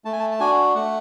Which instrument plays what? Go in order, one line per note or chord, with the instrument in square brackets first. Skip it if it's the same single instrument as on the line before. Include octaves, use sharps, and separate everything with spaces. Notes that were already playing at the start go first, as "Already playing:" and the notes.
[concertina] A3 A5
G#5
A5
A5
D4 F#4 G#5
A3 F#5